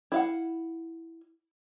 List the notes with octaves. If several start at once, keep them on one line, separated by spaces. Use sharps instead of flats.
E4 F5 F#5